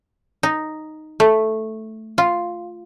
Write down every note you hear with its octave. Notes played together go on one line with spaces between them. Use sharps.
D#4
A3
F4